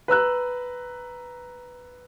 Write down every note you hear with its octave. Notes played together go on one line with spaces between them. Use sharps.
B4 A#5 E6 F#6